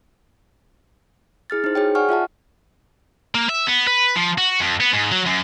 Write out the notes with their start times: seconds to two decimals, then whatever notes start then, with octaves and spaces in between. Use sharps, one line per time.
1.50 E4 G#4 F6 A6
1.64 D#4 C5
1.75 F#4 G#4 C#5 G5
1.95 D5 F#5 G#5 C#6 F6
2.09 F4 E5 F#5 A5
3.35 A#3
3.49 E5
3.67 B3
3.87 B4
4.15 F3
4.38 F#4
4.60 F2
4.80 B3
4.93 G#2
5.12 F#3
5.26 F#2